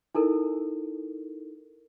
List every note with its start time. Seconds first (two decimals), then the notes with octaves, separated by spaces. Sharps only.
0.15 D#4 E4 A4 A#4